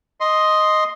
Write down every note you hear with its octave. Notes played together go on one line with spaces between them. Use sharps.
D#5 C6